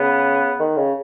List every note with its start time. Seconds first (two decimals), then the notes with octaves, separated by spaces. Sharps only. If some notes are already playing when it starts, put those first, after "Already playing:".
Already playing: C#3 B3
0.59 D#3
0.77 C#3